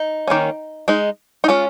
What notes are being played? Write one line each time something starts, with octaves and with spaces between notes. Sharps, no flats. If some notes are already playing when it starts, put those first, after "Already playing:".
Already playing: D#4
D#3 A#3 C#4
G#3 D#4
D#4
G#3 C#4 F4